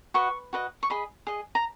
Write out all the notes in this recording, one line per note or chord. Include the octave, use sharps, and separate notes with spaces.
F#4 B4 D#5 C#6
F#4 B4 D#5
C#6
G#4 D#5 B5
G#4 D#5
A#5